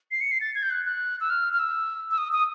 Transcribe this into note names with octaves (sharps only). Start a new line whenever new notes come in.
C7
C#7
C7
A6
G#6
G6
F#6
F#6
E6
F6
F6
E6
E6
D#6
D#6